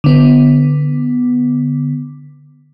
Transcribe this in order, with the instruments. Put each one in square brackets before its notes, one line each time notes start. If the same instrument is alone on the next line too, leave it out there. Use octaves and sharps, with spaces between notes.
[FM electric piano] D3 B3